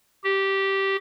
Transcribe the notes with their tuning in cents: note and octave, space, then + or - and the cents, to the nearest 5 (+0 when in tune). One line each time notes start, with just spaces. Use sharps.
G4 -10